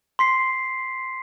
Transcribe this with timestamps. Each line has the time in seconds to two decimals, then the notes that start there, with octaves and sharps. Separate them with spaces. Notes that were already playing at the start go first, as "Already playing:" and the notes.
0.19 C6 B6 C7